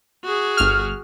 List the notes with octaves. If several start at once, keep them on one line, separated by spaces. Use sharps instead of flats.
F#4 G#4
G1 F6